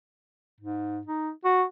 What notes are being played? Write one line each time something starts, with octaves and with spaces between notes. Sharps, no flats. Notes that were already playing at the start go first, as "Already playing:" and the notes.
G#2
D#4
F#4